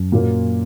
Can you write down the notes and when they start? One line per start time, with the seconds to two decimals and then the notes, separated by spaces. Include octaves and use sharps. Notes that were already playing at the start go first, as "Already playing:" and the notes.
Already playing: F#2
0.12 A#2 F#3 A#3